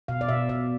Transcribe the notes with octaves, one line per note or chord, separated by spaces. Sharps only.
B2 F5
D5
B2 E5
B2 D5